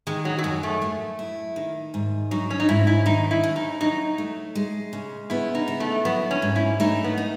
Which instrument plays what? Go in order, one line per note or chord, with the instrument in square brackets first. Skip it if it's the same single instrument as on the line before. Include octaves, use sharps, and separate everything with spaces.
[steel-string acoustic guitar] D#3 [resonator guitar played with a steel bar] G#3
[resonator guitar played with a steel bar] F#3
F#3
[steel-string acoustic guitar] F#2 [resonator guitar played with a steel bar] G#3
[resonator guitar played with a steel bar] A3
[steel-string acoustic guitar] A3
E4
D#3
G#2
[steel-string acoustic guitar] F#3 [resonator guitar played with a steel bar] D#4
[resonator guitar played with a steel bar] C#4
D#4
[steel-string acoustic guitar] G#2 [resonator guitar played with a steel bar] E4
[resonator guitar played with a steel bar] E4
[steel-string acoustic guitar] D#3 [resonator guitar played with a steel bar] D#4
[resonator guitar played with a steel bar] E4
[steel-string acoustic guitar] D#2
[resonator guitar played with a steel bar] D#4
[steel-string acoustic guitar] F#3 [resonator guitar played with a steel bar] D#4
[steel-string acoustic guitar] A3
G#3
C#3
[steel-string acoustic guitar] B3 [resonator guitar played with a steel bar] E4
[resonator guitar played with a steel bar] D#4
[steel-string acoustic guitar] E4
[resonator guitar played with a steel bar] A3
[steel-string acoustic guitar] F#3 [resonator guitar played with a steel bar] B3
[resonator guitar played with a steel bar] C#4
[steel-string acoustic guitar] G#2
[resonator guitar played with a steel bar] E4
[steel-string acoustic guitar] A3 [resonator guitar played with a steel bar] D#4
[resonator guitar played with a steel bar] B3
[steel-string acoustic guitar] D#4